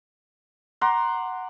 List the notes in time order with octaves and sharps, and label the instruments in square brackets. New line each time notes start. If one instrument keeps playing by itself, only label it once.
[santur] F#5 A#5 C6 D6